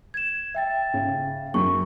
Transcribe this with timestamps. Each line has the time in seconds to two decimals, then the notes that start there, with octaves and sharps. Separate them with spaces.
0.14 G#6 E7
0.55 E5 G5 A6
0.94 C#3
1.54 F#2 C#6